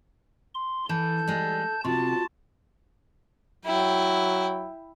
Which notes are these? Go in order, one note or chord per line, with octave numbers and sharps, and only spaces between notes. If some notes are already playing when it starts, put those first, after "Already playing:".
C6
E3 A4 A5 G6
G3 G#3
C3 F4 F#4 A5
F#3 E4 G5